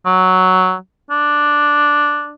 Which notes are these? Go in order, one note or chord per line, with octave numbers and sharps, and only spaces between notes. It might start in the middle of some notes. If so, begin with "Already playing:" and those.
F#3
D4